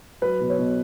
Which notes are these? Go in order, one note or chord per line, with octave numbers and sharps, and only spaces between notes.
F#3 B4
B2
C#5
B2